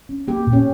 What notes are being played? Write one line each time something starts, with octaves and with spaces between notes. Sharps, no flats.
C#4
A#3 G4
A#2
C#4